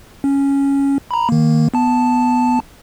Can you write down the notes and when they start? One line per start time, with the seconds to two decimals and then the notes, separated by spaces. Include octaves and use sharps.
0.24 C#4
1.11 A#5 B5
1.29 D#3 A#3
1.74 B3 A5